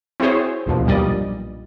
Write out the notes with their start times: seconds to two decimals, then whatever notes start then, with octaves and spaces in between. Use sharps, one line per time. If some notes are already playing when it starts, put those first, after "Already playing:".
0.20 C4 E4 F#4 G#4 C5 C#5
0.66 A#1 D#2 B2 F3
0.85 B1 G2 A#2 G3 D5 D#5